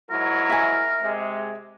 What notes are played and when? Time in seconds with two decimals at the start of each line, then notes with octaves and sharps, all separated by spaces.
0.11 G#2 F#3 E4 A#4
0.50 E5 G#5
1.00 C3 G#3